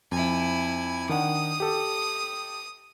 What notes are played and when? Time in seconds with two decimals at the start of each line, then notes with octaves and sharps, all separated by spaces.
0.12 F2 E4 G#5
1.09 D#3 D4 F#5 D#6
1.60 G4 A4